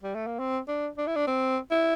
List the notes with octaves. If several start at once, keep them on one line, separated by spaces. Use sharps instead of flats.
G3
A3
A#3
C4
D4
D4
E4
D4
C4
E4